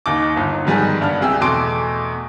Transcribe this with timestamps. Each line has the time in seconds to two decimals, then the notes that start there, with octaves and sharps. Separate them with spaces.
0.06 D#2 D#4 D6
0.36 G1 D#4
0.65 G#2 D3 D#3 G3 B3 G#4
1.01 G2 D4 F#5 F6
1.20 C2 C3 G#4 G5 E6
1.41 E2 B2 A3 C6 D6 D7